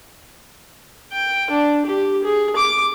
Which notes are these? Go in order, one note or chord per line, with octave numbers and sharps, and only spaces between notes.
G5
D4
G4
G#4
D6